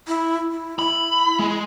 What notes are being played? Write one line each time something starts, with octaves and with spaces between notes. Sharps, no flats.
E4
E4
E4 B5
G#3